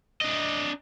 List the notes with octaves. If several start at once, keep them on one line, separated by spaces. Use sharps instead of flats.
D4 D#5